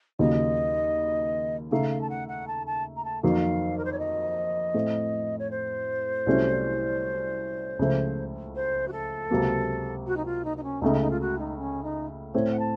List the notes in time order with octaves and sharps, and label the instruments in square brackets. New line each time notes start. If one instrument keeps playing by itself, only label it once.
[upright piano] D#2 C#3 F#3 A#3 [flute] D#5
[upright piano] C#3 A3 D#4 [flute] F5
[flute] F5
A5
F#5
F#5
A5
A5
A#5
A5
[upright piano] F2 D#3 F#3 A#3 [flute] F5
[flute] A#4
C5
C#5
D#5
[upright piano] A2 A3 C4
[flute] C#5
C5
[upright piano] C2 C3 F#3 A3 C#4
C#2 C#3 F3 A3
[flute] C5
F#4
A4
[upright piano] C#2 C3 F#3 A#3
[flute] F#4
D#4
F4
D#4
D#4
C#4
[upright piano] C#2 C#3 A3 [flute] D#4
[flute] D#4
F4
F#4
D#4
C#4
D#4
[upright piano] A2 A3 C4 [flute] C#5
[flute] F#5
A5